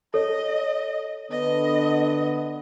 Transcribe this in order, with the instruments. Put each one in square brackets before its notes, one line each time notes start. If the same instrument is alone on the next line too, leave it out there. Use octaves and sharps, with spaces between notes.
[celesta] A4 C#5 [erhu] D#5
[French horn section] D3 B3 [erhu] D#5